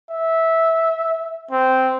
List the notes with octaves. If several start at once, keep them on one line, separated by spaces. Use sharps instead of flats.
E5
C4